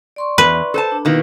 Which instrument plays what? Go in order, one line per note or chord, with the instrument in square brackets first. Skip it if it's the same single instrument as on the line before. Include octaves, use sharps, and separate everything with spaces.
[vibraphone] D5 C6 C#6
[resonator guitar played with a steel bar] E2 [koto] B4
[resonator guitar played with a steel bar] A4 C5 A5
[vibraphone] D4
[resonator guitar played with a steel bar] B2 D#3 A#3 [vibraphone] E4 B4